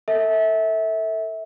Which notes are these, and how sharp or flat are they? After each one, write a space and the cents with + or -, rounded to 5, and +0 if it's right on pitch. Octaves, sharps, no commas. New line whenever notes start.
A4 +25 E5 -25